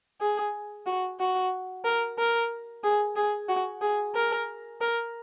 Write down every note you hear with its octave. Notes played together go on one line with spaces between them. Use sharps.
G#4
F#4
F#4
A#4
A#4
G#4
G#4
F#4
G#4
A#4
A#4